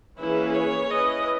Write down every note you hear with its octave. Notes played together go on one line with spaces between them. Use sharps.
E3 A#3 C#4 E4 G#4 B4
C#5
C#4 E4 B4 D#5